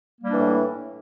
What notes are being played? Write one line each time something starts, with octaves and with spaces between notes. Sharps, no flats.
A2 E3 G3 A#3 D4